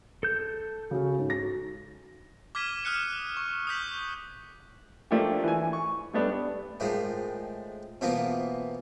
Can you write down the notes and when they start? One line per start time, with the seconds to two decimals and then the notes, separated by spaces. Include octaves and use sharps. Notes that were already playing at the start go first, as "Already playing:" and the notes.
0.23 A4 G6
0.91 C#3 C#4 F#4
1.18 G#2
1.30 A#6
2.55 D6 F6 G#6 B6 D#7 G7
2.85 D#6 F6 F#6 C#7
3.37 C#6
3.67 D#6 F6 G6 B6 F#7
5.11 F3 A3 A#3 D4 G4
5.44 E3 G#5
5.73 C#6
6.13 G3 A3 B3 D4
6.80 A2 D#3 F3 G#3
8.01 B2 E3 F3 A#3 B3